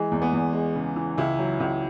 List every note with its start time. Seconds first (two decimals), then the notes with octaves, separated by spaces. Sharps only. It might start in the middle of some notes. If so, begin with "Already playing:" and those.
Already playing: E3 G#3
0.12 E2
0.22 B3
0.33 E2
0.53 G#3
0.75 C#3
0.96 E3
1.18 C#2 E4
1.38 F#3
1.60 C#2